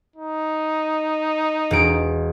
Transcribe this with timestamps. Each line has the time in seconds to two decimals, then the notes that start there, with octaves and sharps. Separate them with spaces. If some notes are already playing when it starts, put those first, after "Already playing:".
0.16 D#4
1.71 E1 D7